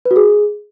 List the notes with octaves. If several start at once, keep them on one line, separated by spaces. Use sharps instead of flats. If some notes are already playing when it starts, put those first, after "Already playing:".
B4
F#4
G#4